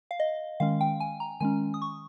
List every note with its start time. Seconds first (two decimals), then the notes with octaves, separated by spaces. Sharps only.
0.11 F5
0.20 D#5
0.60 D#3 G#3 C#4 F5
0.81 G5
1.00 G#5
1.20 A#5
1.40 D#3 G#3 C#4 G#5
1.74 D#6
1.82 C#6